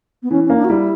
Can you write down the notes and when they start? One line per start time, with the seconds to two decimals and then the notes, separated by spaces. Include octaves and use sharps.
0.23 B3
0.31 E3 C#4
0.44 C#4
0.50 A#3
0.56 D4
0.65 F#4
0.69 G3 E4